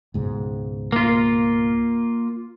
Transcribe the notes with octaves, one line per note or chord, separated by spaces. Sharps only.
C#2 G#2 B2
A#3 F4